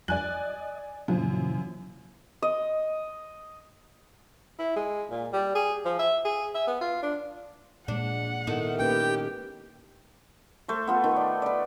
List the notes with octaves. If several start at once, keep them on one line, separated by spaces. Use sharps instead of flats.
F2 F3 G3 D5 G#5 F#6
D#5
F#2 A#2 C#3 E3 F3
D#5
E4
G#3
A#2
G3
G#4
F3
E5
G#4
E5
B3
F4
D4
A#2 G#3 D4 F#5
D#3 A3 B3 E4
A#3 C#4 G4 B4 G5
A3 C5
B3 F4 A4
D#3
D5
B4 D5